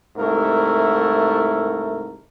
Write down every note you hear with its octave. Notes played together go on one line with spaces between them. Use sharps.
C2 G#2 A3 E4 A#4